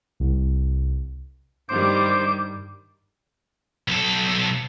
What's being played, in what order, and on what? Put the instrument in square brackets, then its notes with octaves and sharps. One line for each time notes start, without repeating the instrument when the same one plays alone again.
[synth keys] C2
[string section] G2 D#3 G3 [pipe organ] C5 [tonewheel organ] D6
[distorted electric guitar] B1 A4